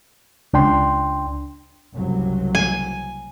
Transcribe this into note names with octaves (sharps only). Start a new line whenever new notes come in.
C#2 D4 G5 C6
F#1 C2 F#3
G#5